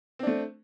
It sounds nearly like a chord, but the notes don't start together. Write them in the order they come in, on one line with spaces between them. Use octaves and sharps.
C4 D4 A3